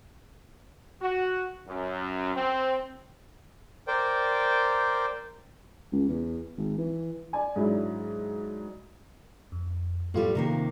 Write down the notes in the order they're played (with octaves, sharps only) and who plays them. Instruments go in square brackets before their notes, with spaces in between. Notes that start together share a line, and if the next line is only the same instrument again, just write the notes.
[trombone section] F#4
F#2
C4
[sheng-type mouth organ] A#4 C5 D5 G5
[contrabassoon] C#2
E2
G#1
E3
[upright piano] D5 G#5
G#2 F#3 D4 E4
[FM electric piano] F2
[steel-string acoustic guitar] A2 G3 [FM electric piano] B3 F4
[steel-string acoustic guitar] C3 D#3 A#3